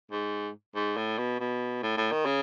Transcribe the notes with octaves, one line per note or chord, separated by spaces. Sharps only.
G#2
G#2
A2
B2
B2
A2
A2
D#3
C#3